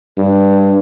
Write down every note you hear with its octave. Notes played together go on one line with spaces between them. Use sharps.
G2